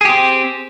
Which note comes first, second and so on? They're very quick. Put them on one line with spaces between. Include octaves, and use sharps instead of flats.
G#4 G4 C4